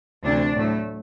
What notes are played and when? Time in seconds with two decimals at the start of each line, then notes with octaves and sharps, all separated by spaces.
0.24 D2 C3 E3 D4
0.55 A2 F#3 A3